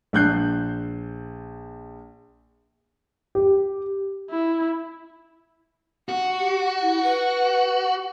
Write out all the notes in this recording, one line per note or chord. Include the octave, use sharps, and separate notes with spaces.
A#1 F#6 G6 C7
G4
E4
F#4 F#5
G4
E4
B4